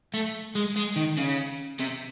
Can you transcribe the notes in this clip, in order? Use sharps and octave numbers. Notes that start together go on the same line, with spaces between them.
A3
G#3
G#3
D#3
C#3
C3